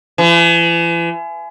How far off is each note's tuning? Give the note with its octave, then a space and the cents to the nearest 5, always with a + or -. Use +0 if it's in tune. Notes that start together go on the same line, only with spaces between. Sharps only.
E3 +40